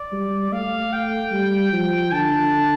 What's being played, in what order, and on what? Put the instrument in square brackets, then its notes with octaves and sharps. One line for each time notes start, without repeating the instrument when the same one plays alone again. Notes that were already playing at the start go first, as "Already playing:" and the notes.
Already playing: [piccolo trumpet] D5
[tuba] G3
[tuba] A3 [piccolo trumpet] F5
[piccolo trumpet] G5
[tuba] G3
F3
[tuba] D3 [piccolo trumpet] A5